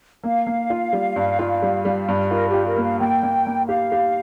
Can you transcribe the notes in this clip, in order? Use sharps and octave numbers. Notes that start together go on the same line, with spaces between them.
A#3 F5
A#3
F4
G3
G2
F4
G3
G3
G2
F4 A#4
G4
F4
A#4
A#3
F5
A#3 G5
A#3
A#3
G4 F5
G4